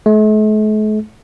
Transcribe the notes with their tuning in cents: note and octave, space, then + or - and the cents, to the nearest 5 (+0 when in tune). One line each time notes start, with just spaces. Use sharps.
A3 -45